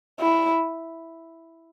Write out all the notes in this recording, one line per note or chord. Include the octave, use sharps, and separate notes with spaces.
E4